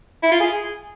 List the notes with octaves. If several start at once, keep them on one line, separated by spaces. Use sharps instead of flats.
E4
F4
G#4